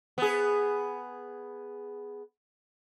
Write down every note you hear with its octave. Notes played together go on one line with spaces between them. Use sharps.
B3 G#4